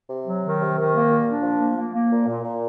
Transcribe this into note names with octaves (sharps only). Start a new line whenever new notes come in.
C3
F#3
D#3
C3
D#3
A#3
A#2
D4
F3
A#3
A#3
A#3
A#2
A#2
A#2